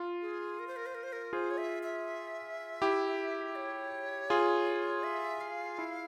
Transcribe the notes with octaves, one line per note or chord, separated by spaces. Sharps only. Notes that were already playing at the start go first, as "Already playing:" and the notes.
Already playing: F4
G#4
A#4
C5
A#4
C5
A#4
C5
A#4
F4 G#4 C5
C#5
E5
E5
E4 G4
C#5
F4 G#4
E5
F5
E4